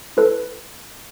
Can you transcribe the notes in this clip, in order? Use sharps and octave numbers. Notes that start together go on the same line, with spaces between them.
E4 A4 B4